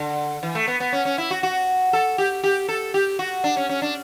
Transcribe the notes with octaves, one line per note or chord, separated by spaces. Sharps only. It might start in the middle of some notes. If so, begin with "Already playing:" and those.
Already playing: D3
E3
A3
B3
B3
C#4
C#4
E4
F#4
F#4
A4
G4
G4
A4
G4
F#4
D4
C#4
C#4
D4